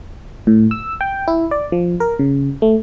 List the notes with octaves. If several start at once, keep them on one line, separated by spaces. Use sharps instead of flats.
A2
E6
G5
E4
D5
F3
A#4
C#3
A3